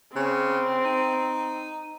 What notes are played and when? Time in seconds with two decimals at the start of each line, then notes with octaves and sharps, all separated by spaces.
0.16 C#3 C4
0.85 D#4